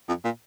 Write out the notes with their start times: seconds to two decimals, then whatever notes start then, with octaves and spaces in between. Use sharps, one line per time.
0.09 F2
0.25 A#2